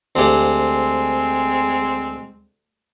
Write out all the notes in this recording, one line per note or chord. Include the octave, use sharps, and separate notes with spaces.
D2 G#3 C4 G4 F#5